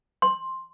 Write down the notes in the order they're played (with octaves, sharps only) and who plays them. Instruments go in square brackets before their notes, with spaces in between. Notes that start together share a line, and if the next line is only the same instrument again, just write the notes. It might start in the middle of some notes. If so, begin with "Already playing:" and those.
[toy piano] C6